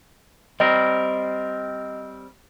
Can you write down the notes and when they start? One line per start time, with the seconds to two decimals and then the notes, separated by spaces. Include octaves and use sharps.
0.60 G3 C4 A#4 D#5